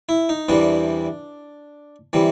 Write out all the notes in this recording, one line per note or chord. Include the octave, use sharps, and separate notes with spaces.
E4
D#4
E2 C3 E3 G3 D4
C3 E3 G3